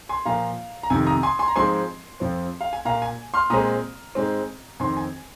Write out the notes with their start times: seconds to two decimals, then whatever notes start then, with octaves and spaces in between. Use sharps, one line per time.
0.09 G#5 C6
0.26 A#2 F3 A#3 F5 A#5
0.83 A#5
0.90 F2 C3 D#3 G#5
1.07 A#5 D#6
1.23 G#5 C6
1.39 G#5 C6
1.48 A#5
1.56 G#2 F3 G#3 C4 G#5 C6
2.20 F2 F3 C4
2.61 F5
2.73 G#5
2.85 A#2 A#3 F5 A#5
3.02 G#5
3.34 C6 F6
3.50 A#2 G#3 C4 A#5 D#6
4.15 G#2 G#3 C4
4.80 F2 D#3 C4 G#5 C6
4.97 G#5